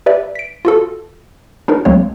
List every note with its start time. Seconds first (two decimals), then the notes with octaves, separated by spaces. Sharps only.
0.06 G4 B4 D5 E5
0.35 B6 D7
0.65 F4 F#4 A4
1.68 D4 D#4 F#4 A#4 B4
1.85 C2 F#3 G#3 A#3 C4 C#5